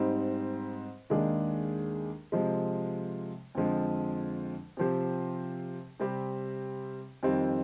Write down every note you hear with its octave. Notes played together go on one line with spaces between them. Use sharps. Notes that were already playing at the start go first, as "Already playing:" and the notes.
Already playing: G#2 G3 C4 D#4
D#2 D#3 G#3 D4 G#4
C3 F3 G#3
F2 D3 F3 G#3
C3 F3 C4 G4 C5
C3 G3 C4 G4
F2 D#3 G3 C4